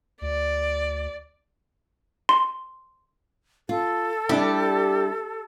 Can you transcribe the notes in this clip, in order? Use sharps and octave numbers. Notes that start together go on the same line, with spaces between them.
D2 D5
C6
F4 A4
G3 D4 E4 G4